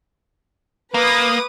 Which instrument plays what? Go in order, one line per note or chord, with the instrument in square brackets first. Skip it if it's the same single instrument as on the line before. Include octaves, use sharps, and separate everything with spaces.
[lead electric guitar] A#3 [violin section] B4 D6 D#6